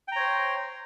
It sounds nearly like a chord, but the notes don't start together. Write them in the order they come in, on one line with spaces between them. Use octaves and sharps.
G5 A#5 C#5 C5